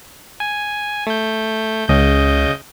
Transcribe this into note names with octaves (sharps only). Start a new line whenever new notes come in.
G#5
A3 G6
C#2 C#3 D#5 G6